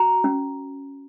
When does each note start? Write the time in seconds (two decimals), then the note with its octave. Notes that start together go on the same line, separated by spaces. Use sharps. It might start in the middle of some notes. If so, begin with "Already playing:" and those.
Already playing: F#4 A#5
0.24 C#4